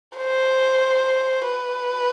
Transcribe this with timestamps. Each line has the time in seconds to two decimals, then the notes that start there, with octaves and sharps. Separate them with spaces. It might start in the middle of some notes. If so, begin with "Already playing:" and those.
0.18 C5
1.46 B4